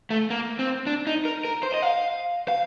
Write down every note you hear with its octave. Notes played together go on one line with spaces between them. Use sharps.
A3
A#3
C4
D4
D#4
A#4
A#4
C5
D#5
F5
F5